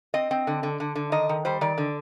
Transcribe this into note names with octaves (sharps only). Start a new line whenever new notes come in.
C4 D#5
C4
D3
D3
D3
D3
D#3 D#5
D#3
G3 C5
D#3 D5
D3